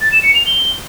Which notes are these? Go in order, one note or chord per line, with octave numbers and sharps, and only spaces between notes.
A6
E7
C#7
F7
G7